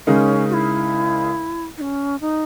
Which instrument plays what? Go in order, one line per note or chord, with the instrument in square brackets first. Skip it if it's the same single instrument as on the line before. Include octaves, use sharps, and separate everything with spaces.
[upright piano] C#3 G#3 D#4 A#4 [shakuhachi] C#4
[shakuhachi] F#4
E4
D#4
C#4
D#4